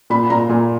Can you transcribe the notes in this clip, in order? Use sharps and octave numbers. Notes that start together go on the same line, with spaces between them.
A#2 B5
A#2 A#5
A#2 G#5